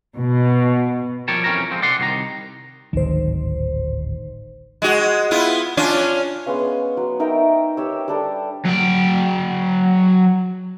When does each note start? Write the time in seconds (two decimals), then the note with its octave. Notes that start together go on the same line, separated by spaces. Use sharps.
0.15 B2
1.28 F3 G3 A#4 C#5 G5 A5
1.44 F2 E3 C#4 A#4 A#5
1.71 F3 G#3 C4
1.82 D5 F#5 C6
1.99 C2 D#3 C5 A#5
2.93 D1 G#1 D2 D#3 C5
4.82 G#3 F#4
5.31 B3 E4 F4
5.77 C#4 D4 F4
6.46 G#3 B3 C#4 F5
6.97 F#3
7.20 D#4 A#4 E5 G5
7.77 G4 C#5 E6
8.08 G3 D4 A4
8.65 F#3 G5